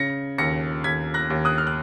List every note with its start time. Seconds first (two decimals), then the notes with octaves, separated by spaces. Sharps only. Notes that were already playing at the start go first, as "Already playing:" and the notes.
Already playing: C#3 A#6 C#7
0.38 D#2 A#6 C#7
0.84 D#2 G#6 B6
1.14 F#6 A#6
1.30 D#2
1.45 D#6 F#6
1.58 F6
1.67 F#6